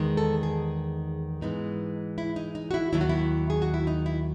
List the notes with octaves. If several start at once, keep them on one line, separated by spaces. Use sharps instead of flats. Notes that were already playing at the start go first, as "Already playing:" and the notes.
Already playing: E2 D#3 G#3
A4
G#4
G#2 E3 G#3 B3 D#4
E4
D#4
D#4
F#4
E4
D#2 D#3 F#3 E4
F#4
E4
G#4
F#4
E4
D#4
E4